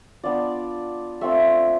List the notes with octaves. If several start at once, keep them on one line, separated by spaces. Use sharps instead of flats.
B3 D4 F4 D5
A3 C4 F4 E5